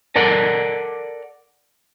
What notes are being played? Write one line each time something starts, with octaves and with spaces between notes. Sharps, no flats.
A4 A#4 D5 F#5